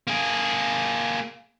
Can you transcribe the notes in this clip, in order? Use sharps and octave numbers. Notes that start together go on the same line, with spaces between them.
A#3 G#4